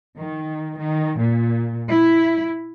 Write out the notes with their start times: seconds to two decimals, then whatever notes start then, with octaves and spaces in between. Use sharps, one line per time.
0.15 D#3
0.78 D#3
1.19 A#2
1.89 E4